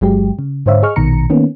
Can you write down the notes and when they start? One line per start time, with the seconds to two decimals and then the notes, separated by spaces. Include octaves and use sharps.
0.01 G1 F#3 G#3 G4
0.39 C#3
0.66 G#2 D3 C5 C#5 E5 F5
0.83 G#4 D#5 C#6 F6
0.96 A#1 B2 D#3 A#5 C#7
1.30 D#3 A#3 B3 C#4